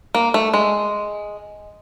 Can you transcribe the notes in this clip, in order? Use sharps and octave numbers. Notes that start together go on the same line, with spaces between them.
A#3
A3
G#3